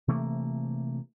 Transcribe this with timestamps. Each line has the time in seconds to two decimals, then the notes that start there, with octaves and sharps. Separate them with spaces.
0.08 C3 E3 A3 A#3